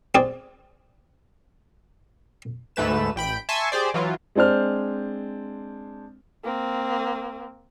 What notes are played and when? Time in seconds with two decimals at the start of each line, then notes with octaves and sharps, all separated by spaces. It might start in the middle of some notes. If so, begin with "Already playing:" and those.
0.15 C4 G#4 D5
2.76 D2 G#2 A3 B4 E7
3.16 A1 G5 B5 D7
3.49 E5 G#5 A5 C6 C#6 E6
3.72 G4 G#4 C5 D5
3.94 E3 F#3 F4
4.35 G#3 C4 D4 C5 F6
6.44 A#3 C4